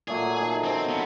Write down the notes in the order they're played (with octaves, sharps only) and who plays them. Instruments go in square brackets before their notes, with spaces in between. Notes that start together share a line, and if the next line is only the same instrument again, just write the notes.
[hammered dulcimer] A#2 F#3 A3 [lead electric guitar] G#4
[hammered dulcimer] D#3 A4
[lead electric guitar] C4 [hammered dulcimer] C5 D#5 A5
[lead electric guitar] B3 F4